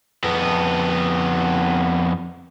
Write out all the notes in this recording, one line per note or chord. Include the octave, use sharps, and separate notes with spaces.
F2 B3